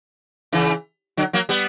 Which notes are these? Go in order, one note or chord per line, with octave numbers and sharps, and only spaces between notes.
C#3 E3
D3 F#3
F#3 A#3
G3 B3